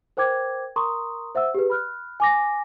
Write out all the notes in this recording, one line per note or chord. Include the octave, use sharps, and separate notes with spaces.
A#4 C5 G5 D6 G#6
A#4 A#5 C6 C#6 D#6
C5 E5 F#5 E6
G4 G#4 B4
B5 F6 F#6
G#5 D6 A#6